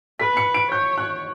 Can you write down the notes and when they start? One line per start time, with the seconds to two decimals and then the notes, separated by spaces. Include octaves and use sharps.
0.20 B4 B6
0.37 C#7
0.54 D7
0.71 C#5 G6
0.98 F#6